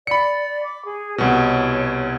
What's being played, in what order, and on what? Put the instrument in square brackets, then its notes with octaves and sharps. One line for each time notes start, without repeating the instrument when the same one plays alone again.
[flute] D5 [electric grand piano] B5 C#7
[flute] D6
G#4
[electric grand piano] C2 B2 [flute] C#5